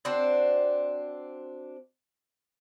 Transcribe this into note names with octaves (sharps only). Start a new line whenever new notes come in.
C4 D4 F#4 C5